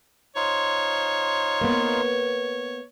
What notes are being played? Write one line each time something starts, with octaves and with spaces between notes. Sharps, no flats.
D#4 F4 C5 C#5
A#3 B3